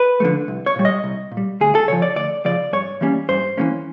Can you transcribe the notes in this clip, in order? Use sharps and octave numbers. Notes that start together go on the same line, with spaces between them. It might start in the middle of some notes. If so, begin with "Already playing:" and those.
Already playing: B4
D3 F3 A3
C2
C#5
A#2 G3
D#5
C2
A#2
G3
D2 G#4
A4
C#3 F3 C#5
D5
D2 D5
C#3 F3 D5
G2 C#5
E3 G3 A#3 C#4
G2 C5
E3 G3 A#3 C#4